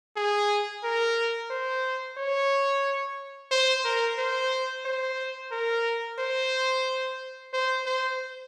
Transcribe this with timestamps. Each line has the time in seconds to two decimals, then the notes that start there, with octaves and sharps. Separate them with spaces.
0.16 G#4
0.84 A#4
1.51 C5
2.18 C#5
3.51 C5
3.85 A#4
4.19 C5
4.85 C5
5.52 A#4
6.19 C5
7.53 C5
7.86 C5